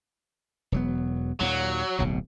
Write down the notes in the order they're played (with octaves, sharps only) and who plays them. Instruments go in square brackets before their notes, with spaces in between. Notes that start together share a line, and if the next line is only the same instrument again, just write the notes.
[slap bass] E1 F#3 B3
[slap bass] D#2 A#2 [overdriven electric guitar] F#3
[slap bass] D1 B1 B2